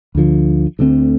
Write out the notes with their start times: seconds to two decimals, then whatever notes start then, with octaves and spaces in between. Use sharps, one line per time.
0.15 D2 D3 F3
0.79 D2 D3 A3 C4